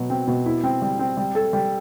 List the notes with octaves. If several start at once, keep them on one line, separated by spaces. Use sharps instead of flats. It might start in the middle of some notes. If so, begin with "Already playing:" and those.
Already playing: B2 F#3
C4
B2
E4
C4
G3
C4
G3
A4
G3